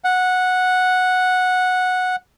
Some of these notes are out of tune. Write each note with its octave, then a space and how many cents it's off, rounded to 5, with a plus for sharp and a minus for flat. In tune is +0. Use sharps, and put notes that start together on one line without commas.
F#5 -10